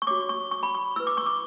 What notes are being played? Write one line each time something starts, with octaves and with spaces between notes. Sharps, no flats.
C#6
F#4 C#5 D6
C#6
C#6
B5
C#6
E4 B4 E6
D6
C#6
D6